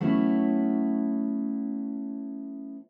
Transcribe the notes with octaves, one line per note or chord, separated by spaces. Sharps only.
F#3 A3 B3 C#4 E4